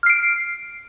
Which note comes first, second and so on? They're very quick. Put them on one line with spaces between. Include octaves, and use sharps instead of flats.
F6 C7 D7